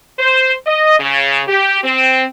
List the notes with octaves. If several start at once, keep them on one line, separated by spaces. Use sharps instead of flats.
C5
D#5
C#3
G4
C4